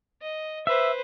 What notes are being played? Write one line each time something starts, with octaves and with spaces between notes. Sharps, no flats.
D#5
B4 C5 E5